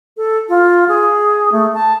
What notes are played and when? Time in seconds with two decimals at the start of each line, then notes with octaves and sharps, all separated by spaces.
0.17 A4
0.49 F4
0.88 G#4
1.52 A3
1.74 A5